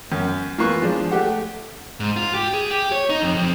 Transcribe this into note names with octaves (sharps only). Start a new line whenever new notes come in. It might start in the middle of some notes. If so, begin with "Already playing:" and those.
F#2
E3 A#3 B3 F4 C#6 F#6
F3 G#3 D4
A3 G4 F#5
G#2
F4
G4
G#4
G4
C#5
D#4
F2
F2